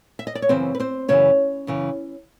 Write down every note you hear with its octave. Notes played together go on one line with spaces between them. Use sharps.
E5
D#5
D5
C#5
F#2 C#3 E3 C4 C5
B4
C4 C5
F#2 C#3 E3 C#4 C#5
F#2 C#3 E3